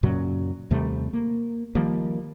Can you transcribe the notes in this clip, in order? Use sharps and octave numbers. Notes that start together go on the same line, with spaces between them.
F#2 A#2 C#3 F#3
D#2 C3 G3 A3
A#3
D#3 F3 G3 A#3